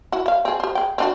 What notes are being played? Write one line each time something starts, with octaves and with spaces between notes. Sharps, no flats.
E4 F#4
E5 F5
C4 G#4
G4 C5
G#4 G5
C4 D4 F#4